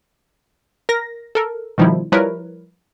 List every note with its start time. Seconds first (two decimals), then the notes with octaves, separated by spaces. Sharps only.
0.89 A#4 A#6
1.35 A4 A#4
1.78 B2 D#3 F3 G3 D#4 E4
2.12 F3 G3 E4 A#4 B4 C#5